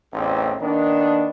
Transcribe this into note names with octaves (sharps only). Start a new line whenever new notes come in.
A1 E2 A3 C4 D#4
D#3 A#3 B3 D4